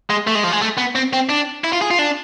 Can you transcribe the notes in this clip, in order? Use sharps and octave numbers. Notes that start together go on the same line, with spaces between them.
G#3
A3
G#3
F3
G#3
A3
B3
C4
C4
D4
E4
F4
G#4
F4
D4